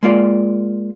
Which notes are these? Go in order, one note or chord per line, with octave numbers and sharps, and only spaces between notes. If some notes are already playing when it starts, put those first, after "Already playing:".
G#3 A#3 F4 D5